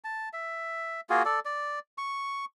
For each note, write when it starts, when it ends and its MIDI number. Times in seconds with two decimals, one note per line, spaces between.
0.04 0.29 81
0.33 1.01 76
1.10 1.23 58
1.10 1.23 65
1.10 1.23 66
1.10 1.23 68
1.25 1.40 69
1.25 1.40 74
1.45 1.79 74
1.98 2.45 85